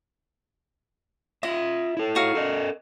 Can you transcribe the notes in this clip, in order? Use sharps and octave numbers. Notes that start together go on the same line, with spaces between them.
F4 D#5 E5
E4 A4
D#4 F#4 F5
A4 A#4 D#5